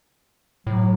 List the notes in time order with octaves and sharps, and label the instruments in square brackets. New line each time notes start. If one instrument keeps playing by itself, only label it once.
[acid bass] A2 [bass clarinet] F#3